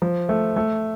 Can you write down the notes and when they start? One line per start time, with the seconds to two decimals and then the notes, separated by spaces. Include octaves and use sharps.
0.02 F3
0.29 A3
0.56 A3